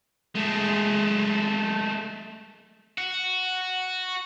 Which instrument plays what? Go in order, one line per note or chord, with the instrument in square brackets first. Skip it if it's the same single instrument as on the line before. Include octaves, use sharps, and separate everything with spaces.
[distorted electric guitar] G#3 A3
F#4